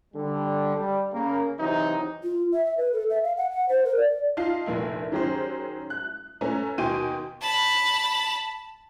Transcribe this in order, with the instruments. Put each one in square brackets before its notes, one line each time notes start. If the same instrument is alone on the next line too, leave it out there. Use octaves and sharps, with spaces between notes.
[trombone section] D3 G3
G3
C#3 A#3
C3 E3 F#3 D#4
[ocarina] F4
E5
E5
B4
A4
E5
F5
F#5
F#5
C5
A#4
D5
[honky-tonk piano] D#4 F4 A5 C7
F1 A#1 A#2 E4
D#3 F#3 C#4 G4 G#4 C5
F#6
A3 C#4 B4 G#5 A#5
D#2 B2 G5 G#5 C6 D#7
[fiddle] A5 B5